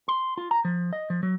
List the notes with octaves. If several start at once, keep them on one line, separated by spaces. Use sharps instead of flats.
C6
F4
A#5
F3
D#5
F3
F#3